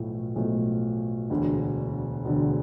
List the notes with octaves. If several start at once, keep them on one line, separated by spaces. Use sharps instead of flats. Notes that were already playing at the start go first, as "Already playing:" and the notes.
Already playing: B1 A2 F3 A3 E4
B1 A2 F3 A3 E4
E1 D2 D3
E1 D2 D3